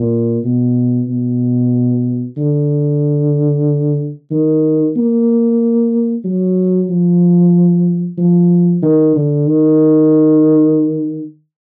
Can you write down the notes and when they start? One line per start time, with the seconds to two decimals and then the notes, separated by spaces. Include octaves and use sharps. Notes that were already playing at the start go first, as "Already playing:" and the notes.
Already playing: A#2
0.45 B2
1.08 B2
2.37 D3
4.31 D#3
4.96 A#3
6.24 F#3
6.90 F3
8.18 F3
8.82 D#3
9.15 D3
9.47 D#3